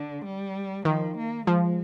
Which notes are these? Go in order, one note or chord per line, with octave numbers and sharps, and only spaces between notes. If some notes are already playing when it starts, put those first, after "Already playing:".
Already playing: D3
G3
D#3 F3
A#3
F3 G#3